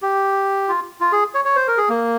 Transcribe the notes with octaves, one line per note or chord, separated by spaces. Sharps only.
G4
F4
F4
G#4
C#5
C#5
C5
A#4
G#4
A#3